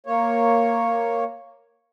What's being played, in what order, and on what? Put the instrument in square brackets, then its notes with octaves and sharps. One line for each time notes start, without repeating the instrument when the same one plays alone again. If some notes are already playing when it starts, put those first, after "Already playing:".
[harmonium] A#3 C#5